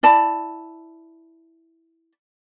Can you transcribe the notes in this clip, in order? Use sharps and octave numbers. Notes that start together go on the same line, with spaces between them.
E4 D5 A5 B5